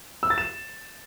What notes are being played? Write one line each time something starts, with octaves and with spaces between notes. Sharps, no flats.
E6
A6
E7